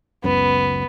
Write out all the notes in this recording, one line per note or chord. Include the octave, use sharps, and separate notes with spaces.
F#1 C#2 F#2 B3